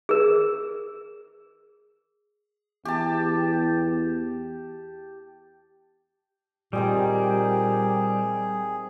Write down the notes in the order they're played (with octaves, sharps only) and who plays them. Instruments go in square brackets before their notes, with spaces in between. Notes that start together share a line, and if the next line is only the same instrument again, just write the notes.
[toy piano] G#4 A#4
[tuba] E2 [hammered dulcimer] G4 A5
[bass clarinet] A#2 [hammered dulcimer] D#3 C4 D#5 [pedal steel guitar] G3 [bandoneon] G#4